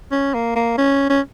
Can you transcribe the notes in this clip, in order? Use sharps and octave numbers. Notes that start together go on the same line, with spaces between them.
C#4
A#3
A#3
C#4
C#4